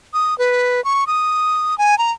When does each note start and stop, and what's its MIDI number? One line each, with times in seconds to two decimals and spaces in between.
0.14 0.37 87
0.38 0.83 71
0.85 1.04 85
1.07 1.78 87
1.78 1.98 80
1.98 2.12 82